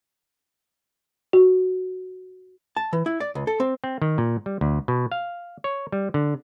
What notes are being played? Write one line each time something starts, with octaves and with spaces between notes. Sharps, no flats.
F#4
A5
E3
E4
D5
C#2
A4
C4
C4
D#3
A#2
G3
D2
B2
F5
C#5
G3
D3